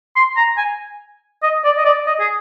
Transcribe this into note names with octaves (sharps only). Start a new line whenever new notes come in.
C6
A#5
G#5
D#5
D5
D#5
D5
D#5
G#4